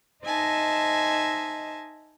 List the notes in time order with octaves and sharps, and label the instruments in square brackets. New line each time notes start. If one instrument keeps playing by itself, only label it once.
[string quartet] D#4 C5 D#5 E5 G#5 A5